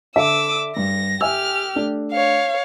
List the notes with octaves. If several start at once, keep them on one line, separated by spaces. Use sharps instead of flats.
D3 A4 E5 D6 E6
G2 A#6
G4 E5 G#5 E6 F6
A3 D4
C#5 F5